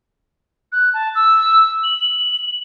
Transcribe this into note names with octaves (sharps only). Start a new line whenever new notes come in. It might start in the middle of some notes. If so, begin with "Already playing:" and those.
F#6
A5
E6
F#7